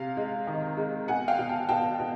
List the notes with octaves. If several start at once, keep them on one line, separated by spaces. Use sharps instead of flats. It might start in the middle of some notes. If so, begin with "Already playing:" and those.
Already playing: C3 F5
G#3
D#3
G#3
B2 F#5 G#5
F5 G5
B2
G5 A5
B2 G5 A5
B2